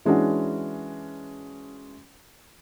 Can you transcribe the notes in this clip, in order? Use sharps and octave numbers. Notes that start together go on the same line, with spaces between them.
E3 G#3 C#4 D4 F#4